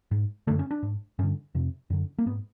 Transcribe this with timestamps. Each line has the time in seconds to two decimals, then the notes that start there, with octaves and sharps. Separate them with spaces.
0.11 G#2
0.47 D3 A3
0.50 F#2
0.59 C#4
0.71 D4
0.83 G#2
1.19 G2 C#4
1.23 D3
1.55 F2 C3
1.90 F#2 D3
2.18 A#3
2.26 G#2 B3